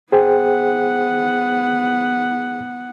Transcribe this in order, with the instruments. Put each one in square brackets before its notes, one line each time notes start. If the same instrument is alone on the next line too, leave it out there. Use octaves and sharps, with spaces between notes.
[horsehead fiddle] B3 F#5 [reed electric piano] G#4 C5 G5